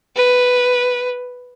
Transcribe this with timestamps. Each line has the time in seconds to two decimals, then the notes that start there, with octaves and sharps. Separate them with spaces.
0.16 B4